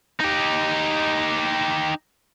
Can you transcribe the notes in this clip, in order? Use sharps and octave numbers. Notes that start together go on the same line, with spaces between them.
D#4 G4